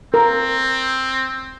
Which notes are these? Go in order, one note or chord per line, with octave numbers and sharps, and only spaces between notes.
C4 A#4